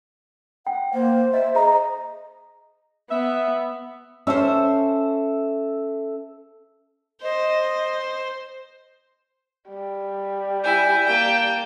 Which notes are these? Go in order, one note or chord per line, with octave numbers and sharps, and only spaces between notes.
F#5 G5
A#3 C5
D#5 E5
G#4 D#5 A#5
B3 E5
C#4 A4 C5 E5
C5 D#5
G3
E4 G#5 G6
A#3 G5 A5